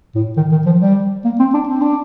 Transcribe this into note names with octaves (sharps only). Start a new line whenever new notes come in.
A2
D#3
D#3
F3
G3
A#3
C4
D4
C4
D4